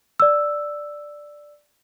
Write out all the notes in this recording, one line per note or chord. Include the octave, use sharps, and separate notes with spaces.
D5 E6